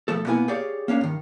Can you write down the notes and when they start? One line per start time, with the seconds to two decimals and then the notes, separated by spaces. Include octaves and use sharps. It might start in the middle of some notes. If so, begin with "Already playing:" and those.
0.08 B1 F3 A3 A4
0.26 B2 A#3 B3 E4 G#5
0.48 G4 G#4 C#5 D5 F5
0.88 A#3 C#4 D4 F5
1.01 G2 D#3